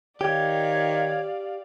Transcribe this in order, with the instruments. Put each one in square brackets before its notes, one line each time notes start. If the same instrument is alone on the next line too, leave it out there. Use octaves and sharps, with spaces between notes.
[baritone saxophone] D#3 [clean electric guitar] G4 [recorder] C#5 [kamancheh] D5 F5